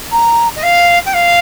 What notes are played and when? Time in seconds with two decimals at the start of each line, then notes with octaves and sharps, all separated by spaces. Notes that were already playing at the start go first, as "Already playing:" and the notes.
0.11 A#5
0.55 D#5
0.62 F5
1.05 G5
1.13 F5